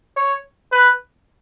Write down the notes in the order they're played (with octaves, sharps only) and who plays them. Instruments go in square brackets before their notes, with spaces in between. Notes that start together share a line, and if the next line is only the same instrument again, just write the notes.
[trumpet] C#5
B4